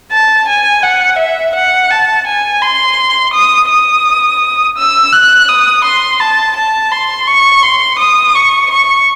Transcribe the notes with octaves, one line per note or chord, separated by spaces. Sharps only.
A5
G#5
F#5
E5
F#5
A5
G#5
C6
D#6
D#6
E6
F#6
D#6
C6
A5
A5
C6
C#6
C6
D#6
C#6
C#6